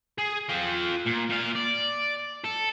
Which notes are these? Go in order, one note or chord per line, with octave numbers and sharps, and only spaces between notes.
G#4
F4 G5
A#2
A#2 F5
D5
A4